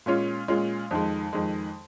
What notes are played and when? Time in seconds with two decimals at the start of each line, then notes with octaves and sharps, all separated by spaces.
0.06 A#2 G#3 C#4 F4
0.48 A#2 G#3 C#4 F4
0.91 F2 D#3 G#3
1.33 F2 D#3 G#3